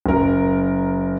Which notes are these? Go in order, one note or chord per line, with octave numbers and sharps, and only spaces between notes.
F#1 A#4